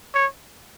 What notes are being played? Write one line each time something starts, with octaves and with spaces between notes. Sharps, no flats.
C#5